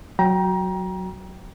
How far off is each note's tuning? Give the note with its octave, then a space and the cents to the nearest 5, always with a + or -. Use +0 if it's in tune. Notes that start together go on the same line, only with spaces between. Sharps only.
F#3 +0 G5 +0 A#5 +25